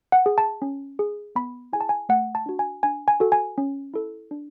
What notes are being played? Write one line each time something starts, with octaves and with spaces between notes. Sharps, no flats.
F#5
G#4
A5
C#4
G#4
B3 B5
E4 G#4 G#5
A5
G#5
A3 F#5
A5
D4 F#4
G#5
D4 G#5
G#5
F#4 A4
G#5
C#4
E4 A4
D4